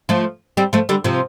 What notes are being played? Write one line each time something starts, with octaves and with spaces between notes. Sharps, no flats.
F3 A3
G3 C4
F3 A3
D3 G3
C3 F3